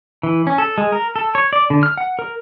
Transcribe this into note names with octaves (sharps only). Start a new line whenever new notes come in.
E3
C#4
A4
G#3
A#4
A4
C#5
D5
D3
F6
F#5
A#4